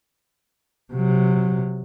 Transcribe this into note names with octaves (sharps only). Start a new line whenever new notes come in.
C3 F#3